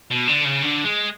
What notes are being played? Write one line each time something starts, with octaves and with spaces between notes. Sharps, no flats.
B2
D3
C#3
D3
G#3